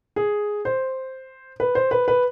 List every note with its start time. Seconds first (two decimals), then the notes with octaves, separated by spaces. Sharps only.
0.16 G#4
0.65 C5
1.60 B4
1.75 C5
1.91 B4
2.08 B4